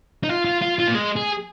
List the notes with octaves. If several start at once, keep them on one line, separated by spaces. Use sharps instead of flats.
D#4
F4
F4
F4
F4
A#3
G#3
G#4